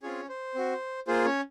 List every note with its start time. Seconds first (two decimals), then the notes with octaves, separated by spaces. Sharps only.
0.03 C4 C#4 F4 G#4 C#5
0.29 C5
0.55 C4 F#4
1.07 A#3 F4 G#4 C5
1.25 C#4 C#5